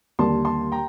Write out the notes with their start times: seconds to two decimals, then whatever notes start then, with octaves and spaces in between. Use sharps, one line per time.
0.19 D#2 D3 G3 A5 C6
0.45 A5 C6
0.72 G5 A#5